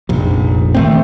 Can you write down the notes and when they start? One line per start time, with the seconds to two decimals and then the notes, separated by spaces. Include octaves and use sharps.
0.09 F1 A#1
0.74 D#3 A3 C4